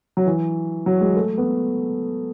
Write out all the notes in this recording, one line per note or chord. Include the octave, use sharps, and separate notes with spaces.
F#3
E3
F#3
G#3
A3
B3